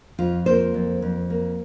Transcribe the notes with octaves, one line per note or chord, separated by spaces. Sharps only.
F2 F4
A#3 C5
F2
F2
A#3